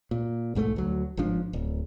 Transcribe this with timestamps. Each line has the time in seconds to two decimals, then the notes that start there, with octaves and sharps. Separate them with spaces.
0.11 A#2
0.55 B1 G#2 F#3 A3
0.76 D2 F#3
1.17 G1 G#2 F3 D4
1.53 D1